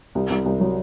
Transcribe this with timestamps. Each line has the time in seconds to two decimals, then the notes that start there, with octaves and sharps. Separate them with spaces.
0.15 C2
0.30 C2
0.46 C2
0.60 F#3